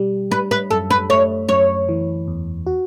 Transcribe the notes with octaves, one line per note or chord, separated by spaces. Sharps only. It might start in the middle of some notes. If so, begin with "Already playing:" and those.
Already playing: B2 G3 G4
G3 B4
B4
F#2 A4
B4
A3 C#5
F#2 C#5
E3
E2
F#4